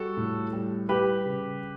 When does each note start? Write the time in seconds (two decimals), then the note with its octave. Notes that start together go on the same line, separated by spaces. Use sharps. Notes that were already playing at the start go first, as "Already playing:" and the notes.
Already playing: G3 F#4 A4
0.17 A2
0.53 G3
0.89 G3 G4 B4
1.26 C#3